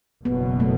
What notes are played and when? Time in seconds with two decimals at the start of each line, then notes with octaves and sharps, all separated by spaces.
0.25 F#1 E2 B2 F#3 B3
0.60 A3